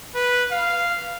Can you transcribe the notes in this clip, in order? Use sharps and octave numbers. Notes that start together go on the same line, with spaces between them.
B4
F5